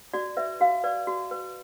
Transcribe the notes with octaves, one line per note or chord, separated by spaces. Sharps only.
F#4 D5
B4 E5
F#4 F5
B4 D5
F#4
B4